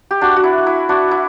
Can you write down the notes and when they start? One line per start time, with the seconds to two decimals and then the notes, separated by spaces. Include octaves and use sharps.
0.11 G4
0.21 D4 F#4
0.36 F#4
0.44 E4
0.66 E4
0.89 D4 F#4
1.11 E4